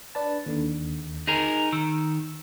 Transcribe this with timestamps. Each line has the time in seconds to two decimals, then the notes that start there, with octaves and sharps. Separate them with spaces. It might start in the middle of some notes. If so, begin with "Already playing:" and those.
0.15 D4 B4 A5
0.46 D#2 D3
1.27 D#4 G#4 A#4
1.73 D#3 E6